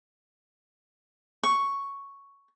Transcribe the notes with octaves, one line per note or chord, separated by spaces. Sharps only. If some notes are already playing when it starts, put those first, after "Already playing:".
C#6